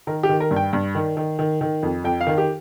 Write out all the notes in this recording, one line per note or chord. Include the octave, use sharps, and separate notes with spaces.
D#3 A#4
G4
D#3
A#4
G2
G5
G2
D#3
D#3
D#3
D#3
F2
F2 G5
F5
D#3
G4